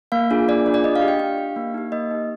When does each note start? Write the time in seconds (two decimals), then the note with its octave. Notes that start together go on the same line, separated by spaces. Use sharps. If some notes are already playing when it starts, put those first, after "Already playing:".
0.12 A#3 F5
0.31 D4 F4 G#4
0.48 A#3 D5
0.66 D4 F4 G#4
0.74 D5
0.84 D4 D#5
0.96 F5
1.02 G4
1.08 G5
1.20 D4 F5
1.38 G4
1.56 A#3
1.74 D#4 G4
1.92 A#3 D#5
2.11 D#4 G4